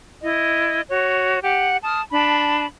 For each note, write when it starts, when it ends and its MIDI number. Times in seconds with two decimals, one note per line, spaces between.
0.22 0.82 64
0.22 0.82 75
0.90 1.39 66
0.90 1.39 73
1.43 1.77 67
1.43 1.77 78
1.84 2.01 81
1.84 2.01 87
1.84 2.01 89
2.12 2.66 62
2.12 2.66 81
2.12 2.66 83